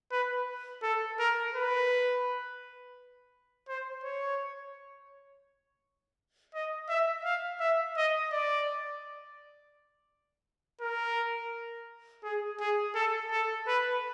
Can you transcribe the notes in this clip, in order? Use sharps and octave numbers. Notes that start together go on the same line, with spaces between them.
B4
A4
A#4
B4
C5
C#5
D#5
E5
F5
E5
D#5
D5
A#4
G#4
G#4
A4
A4
B4